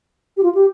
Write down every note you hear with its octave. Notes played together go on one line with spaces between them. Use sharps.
G4
F4
G4